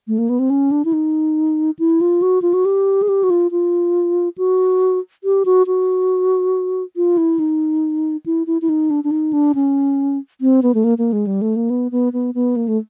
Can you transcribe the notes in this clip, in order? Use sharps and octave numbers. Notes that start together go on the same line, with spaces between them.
A3
A#3
B3
C4
C#4
D4
E4
D#4
E4
F4
F#4
F4
F#4
G4
G#4
G4
F#4
F4
F4
F#4
G4
F#4
F#4
F4
E4
D#4
E4
E4
E4
D#4
D4
D4
D#4
D4
C#4
C4
B3
A3
A#3
A#3
G#3
G3
A3
A#3
B3
B3
B3
B3
A#3
A3